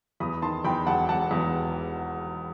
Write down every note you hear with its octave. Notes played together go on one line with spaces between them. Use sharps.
E2 B5 D#6
D#3 A5 C6
E2 G5 B5
E1 F#5 A5
E1 F#5 A5
E2